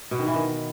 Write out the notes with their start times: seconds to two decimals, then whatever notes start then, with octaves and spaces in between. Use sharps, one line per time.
0.11 B2
0.19 D#3
0.27 E3
0.34 D#3